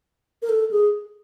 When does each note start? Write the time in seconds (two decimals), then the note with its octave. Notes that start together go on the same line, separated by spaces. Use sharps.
0.42 A#4
0.49 A4
0.71 G#4